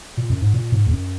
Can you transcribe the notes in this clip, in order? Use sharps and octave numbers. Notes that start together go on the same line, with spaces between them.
A#2
F#2
G#2
A#2
G#2
E2
F#2